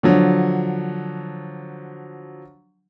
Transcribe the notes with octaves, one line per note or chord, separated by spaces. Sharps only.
D3 F3 F#3